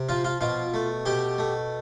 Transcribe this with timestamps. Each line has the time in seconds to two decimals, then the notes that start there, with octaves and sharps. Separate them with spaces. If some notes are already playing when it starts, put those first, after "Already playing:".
Already playing: C3
0.09 F3 F4 F5
0.24 F4 F5
0.41 B2 F4 F5
0.74 A3
1.06 B2 G4 G5
1.38 A3